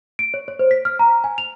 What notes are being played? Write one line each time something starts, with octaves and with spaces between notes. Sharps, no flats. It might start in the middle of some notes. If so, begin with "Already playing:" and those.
D7
C#5
C#5
C5
B6
F6
A#5
G#5
F7